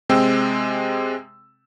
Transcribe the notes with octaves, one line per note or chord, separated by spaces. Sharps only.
C3 G#3 C4 G5 E6